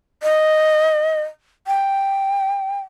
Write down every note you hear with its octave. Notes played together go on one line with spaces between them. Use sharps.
D#5
G5